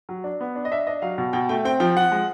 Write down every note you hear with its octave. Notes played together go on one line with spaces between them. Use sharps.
F#3
D4
B3
D4
D#5
D4 E5
D4 D#5
F#3 F5
B2
B2 G5
A3 G5
C4 G5
F3 G5
F3 F#5
G#3